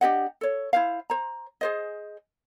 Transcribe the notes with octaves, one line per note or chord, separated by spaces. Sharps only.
D4 G4 D#5 F#5
A4 C#5
E4 C5 F5
C5 A#5
G#4 C5 D#5